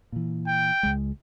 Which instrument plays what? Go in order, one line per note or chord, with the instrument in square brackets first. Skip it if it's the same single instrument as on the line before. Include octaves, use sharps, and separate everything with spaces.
[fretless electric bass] A#2 E3
[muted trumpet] G5
[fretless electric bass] C#2 G#3